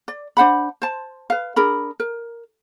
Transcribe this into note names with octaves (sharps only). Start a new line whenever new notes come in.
D5
D4 C5 F#5 B5
C5 A5
B4 F5
D4 G#4 A#4 B5
A#4